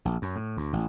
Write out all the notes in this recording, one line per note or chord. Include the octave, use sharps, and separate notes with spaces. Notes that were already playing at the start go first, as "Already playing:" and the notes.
A#1
F#2
A2
D2
A1